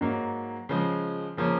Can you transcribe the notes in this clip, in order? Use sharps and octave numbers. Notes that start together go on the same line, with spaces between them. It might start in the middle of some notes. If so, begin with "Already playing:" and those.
G#2 F#3 A#3
C#3 F3 G#3
C#3 F3 A#3 C#4